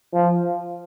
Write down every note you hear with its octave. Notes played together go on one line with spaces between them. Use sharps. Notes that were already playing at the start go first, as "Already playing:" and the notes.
F3